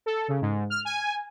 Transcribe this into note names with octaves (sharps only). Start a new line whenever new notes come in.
A4
C#3
G#2
F6
G#5